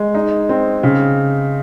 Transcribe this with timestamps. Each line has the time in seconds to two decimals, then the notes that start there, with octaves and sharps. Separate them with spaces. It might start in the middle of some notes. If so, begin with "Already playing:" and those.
Already playing: G#3
0.14 D#4
0.49 C4
0.83 C#3